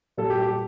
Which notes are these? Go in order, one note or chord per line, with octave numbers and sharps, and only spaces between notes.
A#2 G3 A4
G4
G4